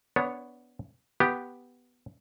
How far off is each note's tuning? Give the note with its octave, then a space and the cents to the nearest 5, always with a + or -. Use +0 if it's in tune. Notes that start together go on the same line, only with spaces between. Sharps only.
B3 +0 D4 -20 C#5 +0
B3 +0 G4 +0